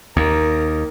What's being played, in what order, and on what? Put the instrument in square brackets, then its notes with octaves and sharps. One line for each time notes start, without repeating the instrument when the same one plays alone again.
[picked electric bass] D#2 [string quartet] A#4